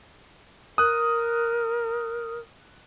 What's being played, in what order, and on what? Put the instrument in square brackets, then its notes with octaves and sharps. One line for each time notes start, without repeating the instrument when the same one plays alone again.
[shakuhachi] A#4 [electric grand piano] D#6 F#6